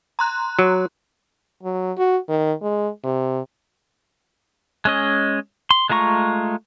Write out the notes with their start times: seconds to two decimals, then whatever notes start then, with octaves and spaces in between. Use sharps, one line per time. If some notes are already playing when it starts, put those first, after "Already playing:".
0.19 A#5 C6 F#6
0.59 F#3
1.63 F#3
1.98 F#4
2.29 D#3
2.62 G#3
3.04 C3
4.85 G#3 C#4 D#5
5.71 C6
5.90 G#3 A3 F4 A#5 C#6